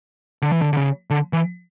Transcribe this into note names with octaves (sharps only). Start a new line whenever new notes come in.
D3
E3
D3
D3
C#3
D3
E3